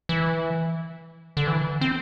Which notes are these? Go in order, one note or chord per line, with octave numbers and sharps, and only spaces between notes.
E3
D3
E3
C4